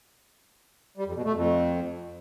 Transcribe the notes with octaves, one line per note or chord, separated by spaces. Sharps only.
G3
F2
B2
A3
F2